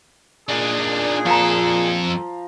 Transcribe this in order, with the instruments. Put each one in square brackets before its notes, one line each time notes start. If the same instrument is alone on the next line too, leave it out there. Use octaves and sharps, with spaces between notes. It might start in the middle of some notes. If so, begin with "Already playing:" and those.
[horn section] A#2 G#4 [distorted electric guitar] D4 D#4
[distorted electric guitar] F2 A4 [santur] F3 A#5